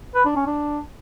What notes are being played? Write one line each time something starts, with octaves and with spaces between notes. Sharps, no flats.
B4
D4
C#4
D4